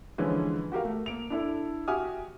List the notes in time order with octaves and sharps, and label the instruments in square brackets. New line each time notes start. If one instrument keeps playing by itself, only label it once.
[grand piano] D3 E3 F3 G#3 C#4
F#4 G4 A#4 F5
A3
A#3 D7 F7
D4 E4 A4
F#4 G4 E5 G#5 D#6 F6